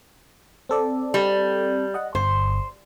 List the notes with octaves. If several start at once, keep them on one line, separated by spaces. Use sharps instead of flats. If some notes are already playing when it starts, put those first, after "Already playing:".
C4 A4 D5
G3
D#5 F#5
G1 C5